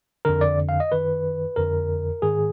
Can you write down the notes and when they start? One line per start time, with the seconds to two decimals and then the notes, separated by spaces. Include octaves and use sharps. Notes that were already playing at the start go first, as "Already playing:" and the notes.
0.25 F2 D3 A#4
0.41 D5
0.69 F5
0.80 D#5
0.92 F#2 D#3 B4
1.56 F2 D3 A#4
2.22 G#2 D#3 G#4